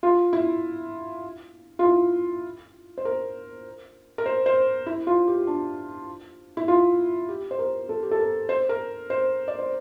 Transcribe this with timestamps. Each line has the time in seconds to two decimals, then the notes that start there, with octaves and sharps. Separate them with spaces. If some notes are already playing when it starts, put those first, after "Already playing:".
0.03 F4
0.33 E4
1.79 F4
1.84 E4
2.98 C5
3.05 A#4
4.18 A#4
4.26 C5
4.46 C5
4.86 E4
5.07 F4
5.28 G4
5.47 D4
6.57 E4
6.68 F4
7.29 G4
7.51 C5
7.59 A#4
7.89 A4
8.03 G4
8.11 A4
8.19 A#4
8.49 C5
8.69 A#4
9.10 C5
9.48 D5
9.59 C5